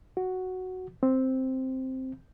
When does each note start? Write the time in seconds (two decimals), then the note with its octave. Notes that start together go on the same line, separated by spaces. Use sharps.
0.17 F#4
1.03 C4